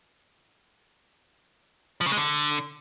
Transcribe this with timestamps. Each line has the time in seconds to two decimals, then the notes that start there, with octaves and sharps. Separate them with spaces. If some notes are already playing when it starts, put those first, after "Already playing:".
2.01 F3
2.06 C#3
2.12 G#3
2.17 D3